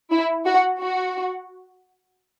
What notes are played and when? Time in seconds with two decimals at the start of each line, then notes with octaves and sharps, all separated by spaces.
0.11 E4
0.46 F#4
0.80 F#4